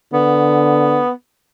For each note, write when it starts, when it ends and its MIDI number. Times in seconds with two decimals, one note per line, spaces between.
0.13 1.02 50
0.13 1.11 59